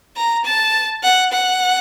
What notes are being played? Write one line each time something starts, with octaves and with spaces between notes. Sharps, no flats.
A#5
A5
F#5
F#5